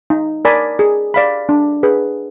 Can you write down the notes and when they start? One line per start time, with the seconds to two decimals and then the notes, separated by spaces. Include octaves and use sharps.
0.10 D#4
0.45 A#4 D5 G#5 B5
0.79 G#4
1.14 D5 F5 B5
1.49 D4
1.83 G#4 B4